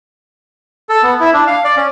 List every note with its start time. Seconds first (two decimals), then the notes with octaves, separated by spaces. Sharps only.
0.89 A4
1.03 B3
1.20 E4
1.34 D4
1.47 F5
1.64 D5
1.77 C#4